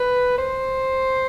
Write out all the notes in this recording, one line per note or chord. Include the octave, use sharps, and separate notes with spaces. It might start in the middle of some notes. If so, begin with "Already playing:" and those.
Already playing: B4
C5